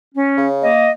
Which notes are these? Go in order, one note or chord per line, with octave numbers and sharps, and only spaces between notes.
C#4
C#3
A#3 D#5